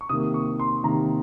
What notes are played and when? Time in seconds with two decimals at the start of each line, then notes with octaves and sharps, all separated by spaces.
0.01 C#6
0.09 C3 D#3 A#3 D#6
0.34 C#6
0.60 C6
0.83 C3 D#3 A#3 A#5